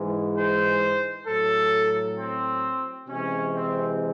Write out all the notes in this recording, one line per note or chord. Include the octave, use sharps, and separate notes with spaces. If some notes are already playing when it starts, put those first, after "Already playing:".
Already playing: G#2 E3 G#3
C5
A2 F#3 A4
C4
C3 E3 G#3 C#4
C4